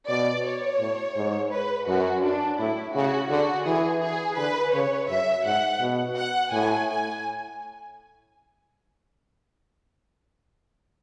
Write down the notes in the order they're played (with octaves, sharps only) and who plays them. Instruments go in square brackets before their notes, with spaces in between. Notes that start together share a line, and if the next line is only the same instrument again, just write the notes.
[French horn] B2 [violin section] D5
[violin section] C#5
[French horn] A2
G#2
[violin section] B4
[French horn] F#2 [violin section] F#4
[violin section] D4
[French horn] A2 [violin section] E4
[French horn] C#3 [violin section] F#4
[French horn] D3 [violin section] F#4
[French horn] E3 [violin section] G#4
[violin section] G#4
[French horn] D3 [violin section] B4
[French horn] C#3 [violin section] C#5
[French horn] F#2 [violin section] E5
[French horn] G#2 [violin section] F#5
[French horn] B2
[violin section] F#5
[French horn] A2 [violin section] G#5
[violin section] G#5